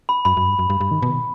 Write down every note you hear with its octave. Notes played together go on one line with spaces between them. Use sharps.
B5
F#2 B5
F#2
G2
F#2
G2
G2
D#3
B2